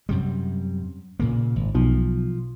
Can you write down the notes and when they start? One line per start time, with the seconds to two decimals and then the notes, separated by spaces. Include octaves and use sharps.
0.09 F#2 C3 G3
1.20 A#2 C#3 A#3
1.56 G#1
1.75 B1 F3